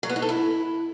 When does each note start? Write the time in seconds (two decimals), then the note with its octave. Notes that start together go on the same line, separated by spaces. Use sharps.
0.03 F#3
0.09 B3
0.16 D#4
0.22 A4
0.29 E4